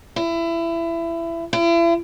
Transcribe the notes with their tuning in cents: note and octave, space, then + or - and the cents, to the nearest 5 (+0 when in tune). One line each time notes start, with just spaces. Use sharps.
E4 +25
E4 +40